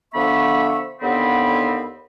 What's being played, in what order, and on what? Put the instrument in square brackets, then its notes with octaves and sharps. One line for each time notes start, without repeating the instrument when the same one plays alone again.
[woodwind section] D3 F3 B3 E5 B5 C#6
D#2 D3 B3 C4 B5